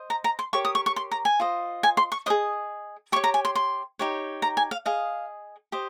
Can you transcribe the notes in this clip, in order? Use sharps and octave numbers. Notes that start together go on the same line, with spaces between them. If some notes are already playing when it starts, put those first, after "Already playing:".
Already playing: C5 D#5
A#5
A#5
C6
G4 A#4 C#5 C#6
D#6
C#6
C#6
C6
A#5
G#5
F4 C5 D#5
G#5
C6
C#6
G#4 C5 D#5 D#6
G4 C#5 C#6
A#5
G#5
C6
C6
D#4 G4 C#5
A#5
G#5
F5
G#4 D#5 F5
G4 C5 D#5